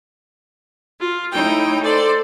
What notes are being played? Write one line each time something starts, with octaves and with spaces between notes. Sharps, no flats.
F4
A3 D#4 E4 C#5 G5
A4 C5 D5